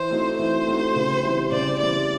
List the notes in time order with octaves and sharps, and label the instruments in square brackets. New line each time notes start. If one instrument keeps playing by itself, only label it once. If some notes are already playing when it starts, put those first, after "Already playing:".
Already playing: [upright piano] E3 [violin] C5
[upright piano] A3 C4 D#4 F#4
[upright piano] E3 [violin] C5
[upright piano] A3 C4 D#4 F#4
C#3
E3 G3 C4
[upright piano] C#3 [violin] D5
[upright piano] E3 G3 C4 [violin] D5